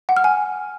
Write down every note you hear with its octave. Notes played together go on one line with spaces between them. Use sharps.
F#5
F6
G#5